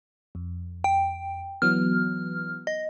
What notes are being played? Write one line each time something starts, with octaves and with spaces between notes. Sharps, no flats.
F2
G5
E3 F#3 B3 F6
D#5